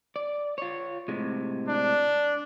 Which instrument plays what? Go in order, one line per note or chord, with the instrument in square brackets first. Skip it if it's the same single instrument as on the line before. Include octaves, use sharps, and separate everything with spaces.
[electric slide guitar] D5
F4 C#5
A2 C3 G#3
[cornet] D4